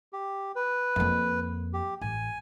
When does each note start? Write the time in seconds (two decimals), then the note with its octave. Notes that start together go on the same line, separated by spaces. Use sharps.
0.13 G4
0.56 B4
0.96 F2 A#3
1.73 G4
2.01 A1 G#5